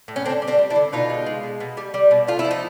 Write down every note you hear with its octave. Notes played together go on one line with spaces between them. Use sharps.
A2
C#4
D3 C4 D4
G3
C4 D4
G3
D4 E4
D3
B2 D#4 F4
G#3
G#3
B2
B2
G3
G3
B2
A3 F4
E4
F3
D#4